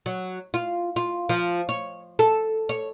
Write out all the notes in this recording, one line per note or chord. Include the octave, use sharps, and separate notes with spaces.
F#3
F4
F4
F3
C#5
A4
C#5